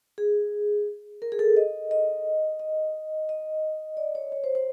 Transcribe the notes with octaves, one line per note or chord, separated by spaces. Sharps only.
G#4
A#4
G#4
A4
D#5
D#5
D#5
D#5
D5
C#5
C#5
C5
C5